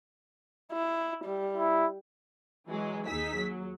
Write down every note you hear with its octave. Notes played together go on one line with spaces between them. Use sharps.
E4
G3
E4
E3 F#3 G#3
D#2 D#4 G#4 E6 B6
F#3